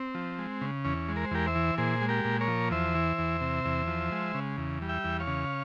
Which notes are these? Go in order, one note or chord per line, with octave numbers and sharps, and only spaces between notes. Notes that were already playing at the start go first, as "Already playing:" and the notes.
Already playing: C4
F3
G#3
C#3
E2 C#4
G#3
A#4
C5
E2 G4 A#4
C5 E5
E3
A#2 G#4 C5
G#3
G4 A#4
A#2
A#4 C#5
F3
E2 C5 E5
E3
E2
C3
E2
F3
G#3
C#3
E2
G3
E5 G5
E2
C#5 F5
C#3